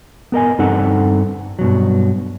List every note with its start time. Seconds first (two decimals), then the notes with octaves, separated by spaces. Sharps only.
0.32 B3 A#4 D#5 G#5
0.59 G2 C4 D#4 A4 F#5
1.59 G2 B2 F#3